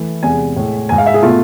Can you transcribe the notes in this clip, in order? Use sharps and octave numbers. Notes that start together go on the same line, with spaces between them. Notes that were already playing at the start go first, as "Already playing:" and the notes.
Already playing: E3 A3
E2 C3 G#3 G#5
A2 G#3
G#2 G#3 G#5
F5
E5
G#4
B2 A3 F4